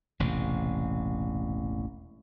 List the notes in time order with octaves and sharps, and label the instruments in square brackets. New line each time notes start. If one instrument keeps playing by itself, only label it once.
[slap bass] E1 A1 C3